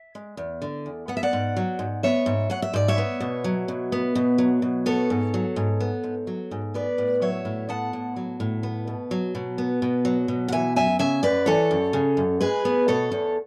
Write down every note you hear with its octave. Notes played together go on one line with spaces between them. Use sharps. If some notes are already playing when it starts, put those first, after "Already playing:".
Already playing: E5
G#3
E2
D3
E2
B3 F#5
E5
D5 F#5
G#2
F#3
G#2
B3 C#5 E5
G#2
F#3 F#5
E5
G#2 D5
C#5 E5
B3
B2
F#3
B2
B3
B2
F#3
B2
B3 A4 C#5
G#2
F#3
G#2
B3
G#2
F#3
G#2
B3 B4 D5
A2
F#3 C#5 E5
A2
B3 F#5 A5
A2
F#3
A2
B3
B2
F#3
B2
B3
B2
F#3
B2
F#5
E3 E5 G#5
F#2 E5 G#5
C#3 E5 G#5
F#2 B4 D5
E3 A4 C#5
F#2
C#3
F#2
G#3 G#4 B4
B3
B2 A4 C#5
E2